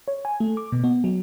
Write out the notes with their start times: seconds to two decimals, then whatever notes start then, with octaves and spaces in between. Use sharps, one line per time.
0.08 C#5
0.25 G#5
0.40 A3
0.57 D6
0.72 B2
0.84 B3
1.04 F#3